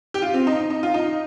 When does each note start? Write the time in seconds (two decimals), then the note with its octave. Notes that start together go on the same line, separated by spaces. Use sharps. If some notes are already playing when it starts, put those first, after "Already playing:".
0.14 G4
0.22 F4
0.34 C4
0.47 D#4
0.70 D#4
0.83 F4
0.94 D#4